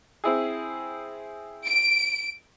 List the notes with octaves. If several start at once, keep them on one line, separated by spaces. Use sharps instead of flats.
C4 E4 G#4
D7